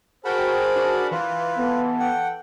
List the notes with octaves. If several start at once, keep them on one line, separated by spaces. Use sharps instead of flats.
F#4 G#4 A#4 C5 G5 A5 B5
D4 F#4
E3 F4 B4
B3 A4
F#5 G5